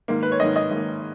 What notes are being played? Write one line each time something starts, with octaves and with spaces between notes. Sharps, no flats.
G#2 D#3 A#3
B4
C#5
G#2 D#3 A#3 D#5
D#5
G#2 D#3 A#3